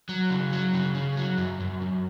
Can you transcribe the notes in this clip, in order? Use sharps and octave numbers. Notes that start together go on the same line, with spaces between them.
F#3
C#3
F#3
C#3
C#3
F#3
F#2
F#2
F#2